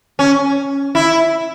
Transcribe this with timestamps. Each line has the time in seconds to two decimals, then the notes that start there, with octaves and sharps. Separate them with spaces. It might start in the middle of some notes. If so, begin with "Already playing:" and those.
0.19 C#4
0.95 E4